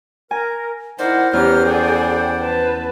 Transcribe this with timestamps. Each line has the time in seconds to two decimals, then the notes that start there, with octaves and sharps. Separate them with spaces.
0.31 A#4 G#5
0.98 D#4 E4 A#4 C5 D5 F#5
1.33 E2 C#4 G4 B4 A#5 F6
1.66 G#4 A4 D5 F#5 G5
2.40 B4 A5